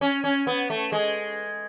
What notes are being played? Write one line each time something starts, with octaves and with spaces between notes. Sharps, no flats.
C#4
C#4
B3
A3
G#3